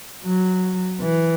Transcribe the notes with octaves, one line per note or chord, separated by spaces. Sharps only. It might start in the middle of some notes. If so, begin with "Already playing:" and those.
F#3
E3